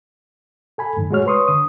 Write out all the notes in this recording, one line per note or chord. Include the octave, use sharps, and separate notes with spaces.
A4 G#5 B5
F#2 A2 D#3
G#3 A3 F#4 G#4 C#5 F6
B4 C#5 C6 C#6 D#6
D3 D#6